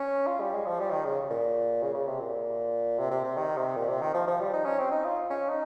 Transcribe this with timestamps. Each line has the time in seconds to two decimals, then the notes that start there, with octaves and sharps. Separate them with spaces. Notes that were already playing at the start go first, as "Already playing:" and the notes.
Already playing: C#4
0.27 F4
0.40 G3
0.53 G#3
0.66 F3
0.79 G3
0.92 D#3
1.05 C#3
1.30 A#2
1.82 C#3
1.94 C#3
2.07 C3
2.20 A#2
2.98 C3
3.11 C3
3.24 C3
3.37 D#3
3.57 C3
3.76 A#2
3.88 C3
4.01 D#3
4.14 F3
4.27 F3
4.40 G3
4.54 D#4
4.66 C#4
4.79 C4
4.91 D#4
5.05 F4
5.30 C#4
5.50 D#4